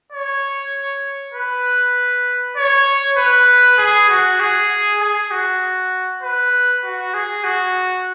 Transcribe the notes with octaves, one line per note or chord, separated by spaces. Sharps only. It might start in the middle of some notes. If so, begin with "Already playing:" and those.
C#5
B4
C#5
B4
G#4
F#4
G#4
G#4
F#4
B4
F#4
G#4
F#4